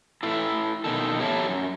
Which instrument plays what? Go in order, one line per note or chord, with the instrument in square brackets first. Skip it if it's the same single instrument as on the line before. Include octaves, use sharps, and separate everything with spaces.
[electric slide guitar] E4 A4 B4
B2 D#3 A4
G4 A4 C#5 E5 G#5 A5
F#2